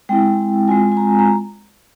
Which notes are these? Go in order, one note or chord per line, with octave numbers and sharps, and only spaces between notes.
G#3 C4 E4 G5
G#3 C4 F4 G#5
G#5
A#5
A#5